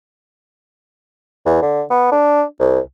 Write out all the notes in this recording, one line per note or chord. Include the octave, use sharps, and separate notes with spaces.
E2
D3
B3
D4
C2